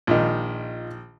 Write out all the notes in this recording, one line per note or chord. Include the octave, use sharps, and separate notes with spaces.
A#1 D#3 F4 D#5